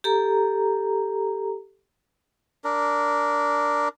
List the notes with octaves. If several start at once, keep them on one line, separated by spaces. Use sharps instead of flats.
G4 A4 A#5
D4 A#4